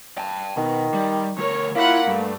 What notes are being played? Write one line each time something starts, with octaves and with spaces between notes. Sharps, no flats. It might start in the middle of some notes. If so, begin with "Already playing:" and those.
G5 A5
B2 D#3
G3
D2 A#4 C#5
A#3 E4 F4 F#5 B5
G2 A3